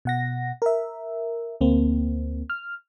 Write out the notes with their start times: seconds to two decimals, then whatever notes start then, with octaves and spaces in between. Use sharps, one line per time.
0.05 B2 F#5 A#6
0.62 A#4 E5
1.61 D2 A#3 C4
2.50 F6